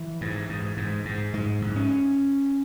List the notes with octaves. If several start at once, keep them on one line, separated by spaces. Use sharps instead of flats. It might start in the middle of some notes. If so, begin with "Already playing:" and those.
Already playing: E3
G#2
G#2
G#2
G#2
G#2 G#3
G#2
C#4